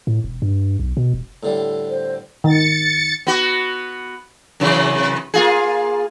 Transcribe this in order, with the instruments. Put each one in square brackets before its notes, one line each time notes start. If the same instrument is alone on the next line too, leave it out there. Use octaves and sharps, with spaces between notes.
[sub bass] A2
E1
G2
B1
B2
E1
[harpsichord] A2 D3 G3
[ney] C5
[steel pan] D#3 [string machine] A6 C#7
[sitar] B3 F#4
F#2 C3 E3
A#3 F4 G#4